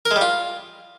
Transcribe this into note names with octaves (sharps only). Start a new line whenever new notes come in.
A#4
G#3
G3
F4